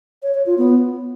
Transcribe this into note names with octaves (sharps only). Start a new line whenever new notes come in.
C#5
C#5
F4
B3